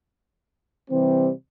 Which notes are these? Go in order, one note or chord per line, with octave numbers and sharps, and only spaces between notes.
C3 E3 G3 C4